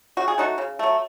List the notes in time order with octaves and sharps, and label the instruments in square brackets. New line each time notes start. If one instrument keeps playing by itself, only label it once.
[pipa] C#3 F#4
G#4
F#3 A3 D#4 F#4
C#3
F#3 A3